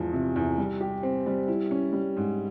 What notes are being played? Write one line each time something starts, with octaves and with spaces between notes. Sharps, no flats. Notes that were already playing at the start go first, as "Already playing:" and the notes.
Already playing: E2 G#2 F3
C3
E2
G3
G4
C4
G3
E4
C#4
G3
G#2